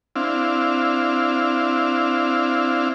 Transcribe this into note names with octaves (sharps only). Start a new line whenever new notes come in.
C4 D4 E4 F5